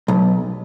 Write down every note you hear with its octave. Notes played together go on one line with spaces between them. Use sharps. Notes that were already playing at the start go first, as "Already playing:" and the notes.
B1